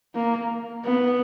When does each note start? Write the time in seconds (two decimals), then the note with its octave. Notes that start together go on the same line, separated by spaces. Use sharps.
0.15 A#3
0.84 B3